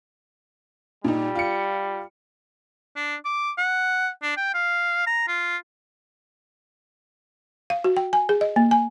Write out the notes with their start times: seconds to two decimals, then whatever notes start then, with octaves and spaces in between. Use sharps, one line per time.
1.04 A#2 G3 D#4
1.35 F4 C#7
2.96 D4
3.25 D6
3.58 F#5
4.23 D4
4.37 G5
4.54 F5
5.07 A#5
5.28 F4
7.70 F5
7.84 F#4
7.97 G5
8.13 G#5
8.29 G#4
8.41 D#5
8.56 A#3
8.71 G#5